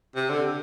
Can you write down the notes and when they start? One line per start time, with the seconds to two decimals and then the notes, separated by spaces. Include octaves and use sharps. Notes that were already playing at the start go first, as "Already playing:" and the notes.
0.16 C3
0.30 D3